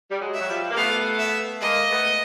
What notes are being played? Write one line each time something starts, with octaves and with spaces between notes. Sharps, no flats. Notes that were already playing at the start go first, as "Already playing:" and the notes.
G3
F#3 G#3
E5
F#3
F3 G3
A#3
A3 B3 F5
E5
G#3 A#3 D#5
A3 B3